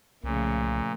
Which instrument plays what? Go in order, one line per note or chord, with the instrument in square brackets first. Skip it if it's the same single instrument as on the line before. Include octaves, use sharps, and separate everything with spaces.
[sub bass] C2 [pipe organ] A#2 [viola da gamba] C#3 F3 A3